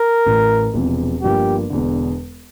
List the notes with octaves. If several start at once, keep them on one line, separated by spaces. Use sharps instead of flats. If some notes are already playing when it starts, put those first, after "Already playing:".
Already playing: A#4
A1 A2 E3
E1 E2 C3 F3
G1 G2 F3 A#3 G4
E1 E2 D3